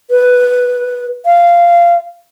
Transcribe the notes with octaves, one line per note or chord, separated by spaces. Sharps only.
B4
F5